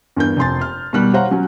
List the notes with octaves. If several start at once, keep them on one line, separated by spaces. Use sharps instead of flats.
E2 G2 A#4 G6
F1 G#5 C6 A6
F6
B2 D#3 G3 F#6
C5 C#5 F5 F#5 A#5
F#3 C#4